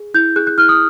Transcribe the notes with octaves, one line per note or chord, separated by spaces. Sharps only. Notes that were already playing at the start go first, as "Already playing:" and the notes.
Already playing: G#4
E4 G6
G#4 F#6
F#6
E4 F6
D#6